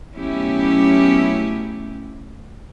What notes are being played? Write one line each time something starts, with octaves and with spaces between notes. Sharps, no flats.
B2 F#3 A3 C#4 E4 G4